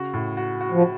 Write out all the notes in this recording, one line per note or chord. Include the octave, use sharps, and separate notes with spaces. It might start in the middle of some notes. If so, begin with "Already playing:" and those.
Already playing: C#3 F#4
A2
F#4
F#4
F3